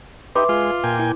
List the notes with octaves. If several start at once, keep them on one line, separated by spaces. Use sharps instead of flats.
D#4 G4 B4 E5 C6 D6
G#3 F4
A#2 G5 G#5
E4